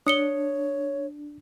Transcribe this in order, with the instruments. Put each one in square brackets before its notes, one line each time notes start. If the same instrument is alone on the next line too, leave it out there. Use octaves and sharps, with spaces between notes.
[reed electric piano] D4 [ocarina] C#5 [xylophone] D#6 C#7 G7